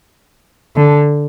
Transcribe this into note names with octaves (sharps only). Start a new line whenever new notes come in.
D3